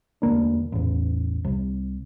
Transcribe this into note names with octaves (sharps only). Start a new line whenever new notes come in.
E1 D2 A#3 D4
A1 E2
C2